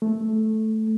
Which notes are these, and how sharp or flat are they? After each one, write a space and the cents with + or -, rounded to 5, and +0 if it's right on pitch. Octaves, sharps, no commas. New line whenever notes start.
A3 -5